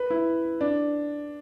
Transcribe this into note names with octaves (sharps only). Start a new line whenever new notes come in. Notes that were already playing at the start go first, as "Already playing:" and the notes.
Already playing: B4
E4
D4